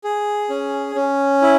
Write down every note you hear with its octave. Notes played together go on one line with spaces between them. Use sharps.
G#4
C#4
C#4
E4